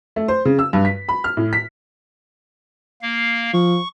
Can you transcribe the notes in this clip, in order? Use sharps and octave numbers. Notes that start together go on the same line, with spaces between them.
A3
C5
C#3
E6
G2
B6
B5
F6
A2
B6
A#3 F5
F3 C#6